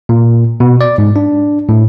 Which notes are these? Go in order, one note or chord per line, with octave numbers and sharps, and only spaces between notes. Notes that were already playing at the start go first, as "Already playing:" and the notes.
A#2
B2
D5
G#2
D4
A2